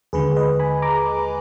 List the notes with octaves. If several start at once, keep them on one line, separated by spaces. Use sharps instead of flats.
D#2 D3 G#3 G#4 B4
B4 D#5
G#5 B5
A#5 D6